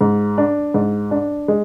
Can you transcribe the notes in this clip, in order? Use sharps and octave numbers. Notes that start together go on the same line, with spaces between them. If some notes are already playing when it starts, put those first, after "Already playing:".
G#2
D4
G#2
D4
G#3